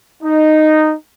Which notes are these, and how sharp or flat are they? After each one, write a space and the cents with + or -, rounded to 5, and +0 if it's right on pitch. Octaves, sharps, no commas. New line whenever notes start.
D#4 -10